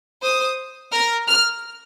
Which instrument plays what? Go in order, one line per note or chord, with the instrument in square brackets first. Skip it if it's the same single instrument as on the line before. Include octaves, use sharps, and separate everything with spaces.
[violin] C5 [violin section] D#6
[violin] A#4 [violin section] F6
[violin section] F6